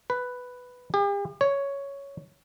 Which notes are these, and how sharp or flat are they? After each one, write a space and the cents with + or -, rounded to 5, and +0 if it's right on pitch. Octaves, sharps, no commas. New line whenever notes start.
B4 +5
G4 +45
C#5 +5